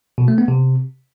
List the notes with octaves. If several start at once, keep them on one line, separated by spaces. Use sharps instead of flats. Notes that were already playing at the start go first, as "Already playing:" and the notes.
B2
A3
B3
C3